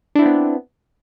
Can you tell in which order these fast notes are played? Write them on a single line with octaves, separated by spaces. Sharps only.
D4 E4 C4 B3